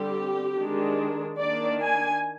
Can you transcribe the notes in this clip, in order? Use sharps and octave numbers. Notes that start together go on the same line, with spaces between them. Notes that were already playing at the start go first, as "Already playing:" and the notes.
Already playing: D3 G3 C4 G4
D#3 G#3 D4
D#3 A#3 D4 D5
G#5